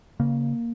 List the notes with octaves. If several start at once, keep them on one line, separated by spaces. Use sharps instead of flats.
C#3 A#3